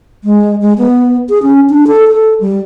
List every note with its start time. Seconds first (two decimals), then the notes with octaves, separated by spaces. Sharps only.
0.24 G#3
0.62 G#3
0.78 B3
1.30 G#4
1.43 C#4
1.70 D4
1.87 A4
2.07 A4
2.41 G3